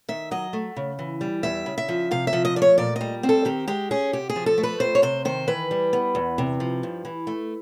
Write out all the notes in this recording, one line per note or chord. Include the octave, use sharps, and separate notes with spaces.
D#3 E5
F#3 D#5
A3
C#3
E3
G3
E2 E5
C#3
E5
F3
C3 F5
E5
F3
D#5
A3 D5
C#5
A#2 D5
G3 D#5
C4
A4
D#3 G4
G#3 G4
C#4 G#4
C3 G4
G#4
F3
A4
A3
B4
F2 C5
C#5
C3 C5
D#3 C5
E3 B4
G3
B3
E2
C3
F3
G2
E3
A3